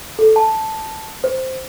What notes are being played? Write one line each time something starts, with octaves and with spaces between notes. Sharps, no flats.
A4
A5
C5